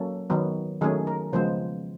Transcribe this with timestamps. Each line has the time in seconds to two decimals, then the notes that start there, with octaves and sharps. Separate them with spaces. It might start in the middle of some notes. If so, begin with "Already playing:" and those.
Already playing: F#3 A#3 C#4 A4
0.30 D#3 F#3 B3
0.81 D#3 F#3 A3 C#4 G#4
1.07 A#4
1.33 C#3 F3 G#3 B3 C5